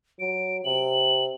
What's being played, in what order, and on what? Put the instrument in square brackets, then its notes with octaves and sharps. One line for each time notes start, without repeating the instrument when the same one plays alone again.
[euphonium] F#3 [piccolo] D7
[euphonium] C3 [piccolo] F#7